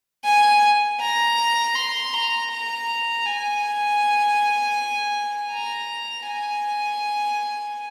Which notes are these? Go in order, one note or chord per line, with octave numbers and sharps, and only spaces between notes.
G#5
A#5
C6
A#5
A#5
G#5
A#5
G#5